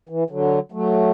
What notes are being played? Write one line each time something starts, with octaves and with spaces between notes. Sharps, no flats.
E3
D3 F#3
F#3 A3